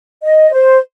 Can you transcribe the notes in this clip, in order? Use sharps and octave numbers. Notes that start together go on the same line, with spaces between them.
D#5
C5